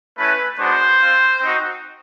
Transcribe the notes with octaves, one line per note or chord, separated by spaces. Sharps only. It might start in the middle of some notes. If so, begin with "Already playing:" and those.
A3 C#4 E4 B4
G#3 B3 D4 F#4 C5
C4 F4
C4 D#4 F#4